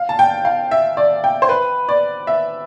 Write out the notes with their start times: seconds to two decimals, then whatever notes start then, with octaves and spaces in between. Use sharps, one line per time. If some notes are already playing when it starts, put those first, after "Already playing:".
Already playing: F5
0.09 A5
0.19 G5
0.45 F5
0.71 E5
0.97 D5
1.24 G5
1.42 C5
1.49 B4
1.89 D5
2.27 E5